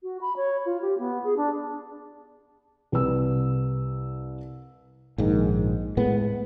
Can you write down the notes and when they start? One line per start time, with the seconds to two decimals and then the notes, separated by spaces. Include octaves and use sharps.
0.03 F#4
0.21 B5
0.36 C#5
0.65 F4
0.81 G4
0.98 B3
1.24 G#4
1.37 D4
2.92 C2 B4 E6
5.18 A#1 G#2 D#3
5.97 A2 G#3 B3